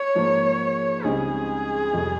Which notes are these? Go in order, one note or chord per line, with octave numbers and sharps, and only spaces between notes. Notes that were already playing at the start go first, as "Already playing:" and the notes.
Already playing: C#5
G#2 F3 A#3
C#2 C#3 G3 C4 D#4 G#4
F2 C3 G3